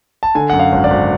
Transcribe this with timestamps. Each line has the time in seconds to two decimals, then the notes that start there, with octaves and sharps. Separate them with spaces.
0.23 A5
0.35 D3 G#5
0.50 F#2 F#5
0.60 F5
0.72 G#1
0.84 D5
0.90 G#1